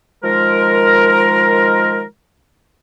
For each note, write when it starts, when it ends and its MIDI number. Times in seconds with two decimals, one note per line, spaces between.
0.23 2.03 51
0.23 2.03 53
0.23 2.03 56
0.23 2.03 70